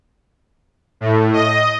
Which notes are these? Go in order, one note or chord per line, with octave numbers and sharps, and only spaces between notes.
A2
D#5